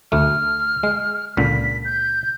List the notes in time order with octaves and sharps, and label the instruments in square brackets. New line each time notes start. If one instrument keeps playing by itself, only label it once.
[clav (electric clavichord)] D2 A3 [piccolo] F6
[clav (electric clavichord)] G#3
[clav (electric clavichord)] C#2 A#2 D3 [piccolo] B6
[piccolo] G6